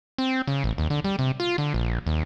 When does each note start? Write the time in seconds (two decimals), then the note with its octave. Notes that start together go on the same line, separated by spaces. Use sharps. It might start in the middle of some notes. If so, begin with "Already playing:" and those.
0.18 C4
0.47 C#3
0.64 A1
0.78 D#2
0.90 D3
1.04 G3
1.19 C3
1.40 F4
1.58 D3
1.74 A#1
2.07 D#2